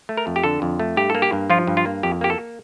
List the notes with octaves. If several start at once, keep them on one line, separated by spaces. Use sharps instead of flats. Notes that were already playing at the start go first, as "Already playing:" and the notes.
A3
A#4
F2
G4
D3 A4
F2
A3
G2 G4
A#3 A4
G4
G2
F3 F4
G2
F4
A#3
F2 G4
A#3 G4
A4